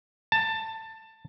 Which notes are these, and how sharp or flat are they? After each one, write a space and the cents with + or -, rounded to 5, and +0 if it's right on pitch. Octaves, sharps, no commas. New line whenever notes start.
A5 +15